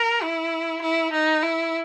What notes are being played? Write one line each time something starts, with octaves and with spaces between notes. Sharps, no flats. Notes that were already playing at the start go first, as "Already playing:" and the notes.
Already playing: A#4
E4
E4
D#4
E4